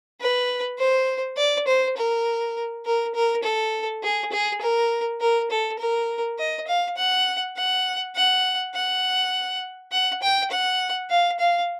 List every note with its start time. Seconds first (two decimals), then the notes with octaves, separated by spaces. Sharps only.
0.20 B4
0.78 C5
1.37 D5
1.67 C5
1.97 A#4
2.86 A#4
3.15 A#4
3.43 A4
4.03 G#4
4.32 G#4
4.62 A#4
5.21 A#4
5.50 A4
5.79 A#4
6.39 D#5
6.68 F5
6.97 F#5
7.57 F#5
8.16 F#5
8.75 F#5
9.92 F#5
10.22 G5
10.51 F#5
11.10 F5
11.39 F5